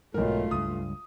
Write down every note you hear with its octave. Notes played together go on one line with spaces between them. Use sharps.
B1 G#2 A3 F4 A#4
C#2 G2 D#6